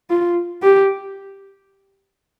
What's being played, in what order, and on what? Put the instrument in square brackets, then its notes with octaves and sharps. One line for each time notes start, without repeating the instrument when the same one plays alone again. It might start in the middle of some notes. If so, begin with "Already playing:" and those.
[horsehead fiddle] F4
G4